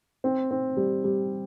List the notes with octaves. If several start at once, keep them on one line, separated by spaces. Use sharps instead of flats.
C4
C4
G3
G3